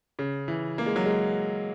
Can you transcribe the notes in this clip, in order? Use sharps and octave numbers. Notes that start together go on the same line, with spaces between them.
C#3
E3
A#3
G#3
F#3
G#3